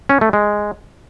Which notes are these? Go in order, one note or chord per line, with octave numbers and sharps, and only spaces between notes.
C#4
A3
G#3